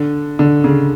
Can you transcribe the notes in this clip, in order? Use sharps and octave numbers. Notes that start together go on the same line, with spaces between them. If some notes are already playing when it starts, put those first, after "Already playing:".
Already playing: D3
D3
C#3